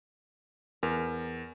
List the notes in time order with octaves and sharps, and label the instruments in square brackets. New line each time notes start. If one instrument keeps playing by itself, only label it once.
[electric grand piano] E2 [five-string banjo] A#4